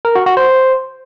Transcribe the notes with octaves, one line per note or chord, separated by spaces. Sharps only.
A#4
F#4
F#4
C5